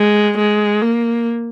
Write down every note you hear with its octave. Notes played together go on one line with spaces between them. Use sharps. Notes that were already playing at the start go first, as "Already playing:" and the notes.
Already playing: G#3
G#3
A#3